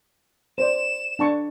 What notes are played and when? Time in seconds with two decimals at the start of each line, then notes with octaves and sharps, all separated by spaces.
0.58 C5 D5 E7
1.19 D4 A5 C#6